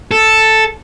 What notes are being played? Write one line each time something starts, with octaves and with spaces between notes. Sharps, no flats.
A4